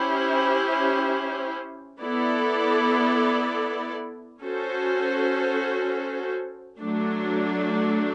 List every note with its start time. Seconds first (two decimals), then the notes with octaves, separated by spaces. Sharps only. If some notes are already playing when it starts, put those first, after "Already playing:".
Already playing: C#4 E4 G4 C5
2.01 B3 E4 A4 D5
4.40 C#4 F#4 A4 C5
6.79 F#3 A3 D4